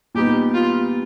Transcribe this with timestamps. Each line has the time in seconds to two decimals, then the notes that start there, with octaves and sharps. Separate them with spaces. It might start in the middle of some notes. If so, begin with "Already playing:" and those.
0.15 A#2 G3 B3 D#4 G4
0.54 F4